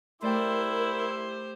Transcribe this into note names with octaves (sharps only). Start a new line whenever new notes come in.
A3 E4 G4 A#4 C5 D5 G5